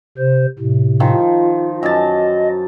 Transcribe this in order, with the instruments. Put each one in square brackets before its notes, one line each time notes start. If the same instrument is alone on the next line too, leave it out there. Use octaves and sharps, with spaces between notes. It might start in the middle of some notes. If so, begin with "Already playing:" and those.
[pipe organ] C3 C5
A2 C3
[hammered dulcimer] D#3 F3
[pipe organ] F4
[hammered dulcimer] F#2 A5 [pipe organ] D#5